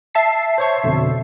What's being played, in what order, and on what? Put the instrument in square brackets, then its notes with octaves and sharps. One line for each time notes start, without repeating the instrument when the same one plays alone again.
[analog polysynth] E5 A5 C7
[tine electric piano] C5 C#5 C#6
F2 B2 D3